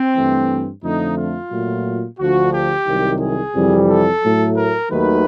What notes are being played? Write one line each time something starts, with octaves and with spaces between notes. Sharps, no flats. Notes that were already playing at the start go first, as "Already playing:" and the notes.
Already playing: C4
G2 E3 A3
F2 D3 F3 A3 D#4
F4
A#2 F#3 A3
D2 D3 F3 F#4
G4
C2 C3 D#3 F#3
G#4
F2 C3 E3 G3
A4
A2 F#3 A3
A#4
D#2 D#3 F#3 A3 B4